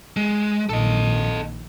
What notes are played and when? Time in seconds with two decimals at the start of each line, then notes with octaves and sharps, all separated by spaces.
0.17 G#3
0.69 A#1 D#3 A4 D#5